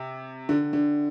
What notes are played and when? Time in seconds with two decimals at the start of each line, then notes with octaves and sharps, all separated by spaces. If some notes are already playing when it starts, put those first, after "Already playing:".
Already playing: C3
0.49 D3
0.73 D3